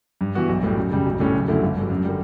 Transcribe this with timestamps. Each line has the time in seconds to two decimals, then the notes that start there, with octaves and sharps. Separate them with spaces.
0.21 G2
0.35 E3 B3 F#4
0.49 B1
0.63 A2 G3
0.76 F#2
0.91 C#3 G3
1.06 B1
1.20 A2 G3 C#4
1.34 F#1
1.48 F#2 D3 A3 E4
1.62 G1
1.76 G2 F#3
1.90 F#2
2.04 D3 G3